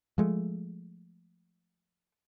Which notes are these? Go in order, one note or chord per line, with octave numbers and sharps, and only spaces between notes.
F3 G#3 A3